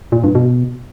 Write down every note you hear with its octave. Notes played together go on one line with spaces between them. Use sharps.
A#2
G2
B2